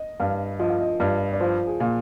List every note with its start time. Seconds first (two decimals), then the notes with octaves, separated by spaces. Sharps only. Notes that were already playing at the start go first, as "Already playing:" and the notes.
Already playing: D#5
0.20 G2 F5
0.60 F3 D#5
0.69 F5
0.80 D#5
1.00 G2 D5
1.33 D5
1.40 F3 C5
1.67 G#4
1.80 A#2